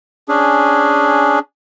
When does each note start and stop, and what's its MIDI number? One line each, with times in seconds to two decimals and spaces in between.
0.29 1.39 61
0.29 1.39 62
0.29 1.39 68